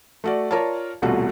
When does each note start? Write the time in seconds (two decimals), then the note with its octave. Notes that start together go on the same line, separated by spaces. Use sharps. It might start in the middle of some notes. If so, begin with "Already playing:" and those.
0.24 A3 F#4 D5
0.51 F4 A#4 C#5 D5 A5
1.02 D#1 C2 B2 A3 F4 F#4